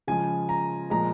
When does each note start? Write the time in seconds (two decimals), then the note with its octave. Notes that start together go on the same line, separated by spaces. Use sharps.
0.07 C#3 F3 G#3 G#5
0.49 A#5
0.90 A#2 F3 G#3 A#5